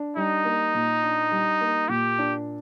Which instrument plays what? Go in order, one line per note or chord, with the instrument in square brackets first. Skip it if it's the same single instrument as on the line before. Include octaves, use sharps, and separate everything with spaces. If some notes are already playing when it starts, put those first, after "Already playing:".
Already playing: [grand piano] D4
[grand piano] G3 [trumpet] D#4
[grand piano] A#3
A#2
D4
G3
A#3
[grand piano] A#2 [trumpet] G4
[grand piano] D4